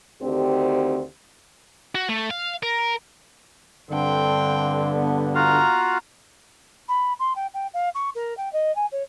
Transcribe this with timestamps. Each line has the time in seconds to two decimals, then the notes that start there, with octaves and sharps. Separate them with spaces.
0.22 D2 D3 D#3 C4 G4
1.95 F#4
2.09 A3
2.30 F5
2.63 A#4
3.90 G2 D3 C4 G5
4.93 B3
5.35 F4 F#4 F5 A#5
6.89 B5
7.20 C6
7.36 G5
7.54 G5
7.74 F5
7.95 C#6
8.15 A#4
8.37 G5
8.53 D#5
8.76 G#5
8.92 C#5